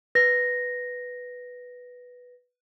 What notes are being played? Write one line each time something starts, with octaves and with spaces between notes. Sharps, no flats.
B4 A#6